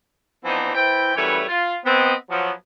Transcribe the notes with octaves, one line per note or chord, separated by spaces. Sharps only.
E3 F3 B3 C4 D4 D#4
E3 E4 C5 G5
F#2 E3 G3 A3 B4 C#5
F4
B3 C4 D#5
F3 F#3 B3